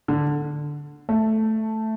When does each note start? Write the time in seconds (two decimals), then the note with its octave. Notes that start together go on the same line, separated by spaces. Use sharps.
0.08 D3
1.09 A3